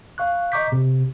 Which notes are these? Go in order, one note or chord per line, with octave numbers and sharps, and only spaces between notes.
F5 C#6 F#6
D#5 A#5 C#6 D6 G6 B6
C3